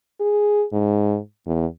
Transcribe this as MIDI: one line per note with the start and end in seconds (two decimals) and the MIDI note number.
0.20 0.64 68
0.72 1.17 44
1.46 1.66 40